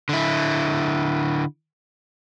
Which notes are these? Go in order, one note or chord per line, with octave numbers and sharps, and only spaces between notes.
D3 E4